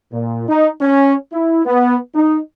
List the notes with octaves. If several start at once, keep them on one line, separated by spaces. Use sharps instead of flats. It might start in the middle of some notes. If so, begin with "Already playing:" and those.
A#2
D#4
C#4
E4
B3
D#4